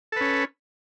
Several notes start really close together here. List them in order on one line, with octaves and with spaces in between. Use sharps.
A4 B4 C#4